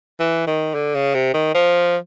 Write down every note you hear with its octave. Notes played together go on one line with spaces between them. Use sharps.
E3
D#3
D3
C#3
C3
D#3
F3